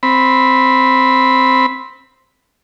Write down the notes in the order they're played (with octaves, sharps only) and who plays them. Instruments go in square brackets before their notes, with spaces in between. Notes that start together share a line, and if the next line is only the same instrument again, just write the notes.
[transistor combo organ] C4 B5